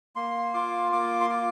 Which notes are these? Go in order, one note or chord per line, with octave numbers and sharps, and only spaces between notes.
A#3 C6
F4 D6
A#3 D6
C6
F4 D6